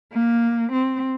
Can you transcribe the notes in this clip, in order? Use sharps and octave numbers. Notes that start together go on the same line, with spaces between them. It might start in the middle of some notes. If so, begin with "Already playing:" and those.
A#3
C4